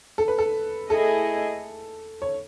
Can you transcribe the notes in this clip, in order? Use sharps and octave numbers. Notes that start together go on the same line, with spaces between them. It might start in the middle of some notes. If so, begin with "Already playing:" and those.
A4
B4
A4
A3 E4 G#4 A4 D#5
C#5